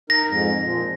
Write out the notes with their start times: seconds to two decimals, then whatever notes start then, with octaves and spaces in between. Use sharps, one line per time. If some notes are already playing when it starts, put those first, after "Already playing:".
0.10 D#4 A#4 A#6
0.27 F2 G#2
0.61 A#2 F3